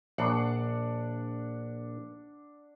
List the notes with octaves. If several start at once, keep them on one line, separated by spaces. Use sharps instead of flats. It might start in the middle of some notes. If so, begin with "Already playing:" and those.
A#1 D4 F#5